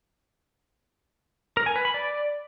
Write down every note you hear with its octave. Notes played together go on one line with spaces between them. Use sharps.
A#4
G#5
B4
B5
D5